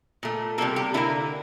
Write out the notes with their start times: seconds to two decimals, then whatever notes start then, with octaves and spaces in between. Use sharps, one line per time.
0.23 A#2 A3
0.58 A#3 A4
0.61 C3 G3
0.76 G4
0.94 D3 G3 A#3 E4